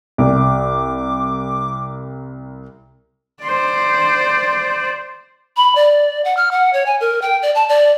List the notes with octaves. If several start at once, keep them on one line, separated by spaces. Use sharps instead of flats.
C2 D6
C5 D5
B5
D5
F#5
F6
F#5
C#5
G#5
A#4
G5
D5
A5
D5